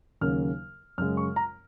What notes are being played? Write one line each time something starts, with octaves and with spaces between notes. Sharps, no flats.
D#2 C#3 F#3 A#3 F6
F#2 C#3 G#3 F6
C#6
A#5